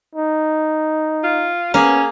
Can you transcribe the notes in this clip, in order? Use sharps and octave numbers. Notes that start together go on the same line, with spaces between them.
D#4
F4
A#3 B3 C#4 G#4